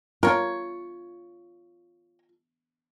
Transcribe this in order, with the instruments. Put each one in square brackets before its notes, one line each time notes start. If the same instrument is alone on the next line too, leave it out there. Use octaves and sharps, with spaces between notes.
[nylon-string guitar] F4 [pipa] A#4 C#5